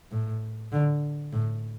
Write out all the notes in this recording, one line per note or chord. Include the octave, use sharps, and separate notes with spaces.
A2
D3
A2